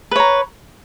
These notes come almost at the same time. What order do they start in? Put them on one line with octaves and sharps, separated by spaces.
B4 C#5 A#5